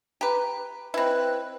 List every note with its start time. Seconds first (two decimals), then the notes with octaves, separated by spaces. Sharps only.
0.21 G4 B4 A#5
0.94 C4 E4 B4 D#5 G5 B5